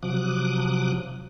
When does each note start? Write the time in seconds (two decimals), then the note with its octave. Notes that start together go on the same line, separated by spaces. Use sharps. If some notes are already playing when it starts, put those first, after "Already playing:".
0.03 C3 F3 F#3 D6 D#6 F#6